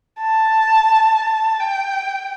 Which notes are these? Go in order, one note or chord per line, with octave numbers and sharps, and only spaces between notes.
A5
G5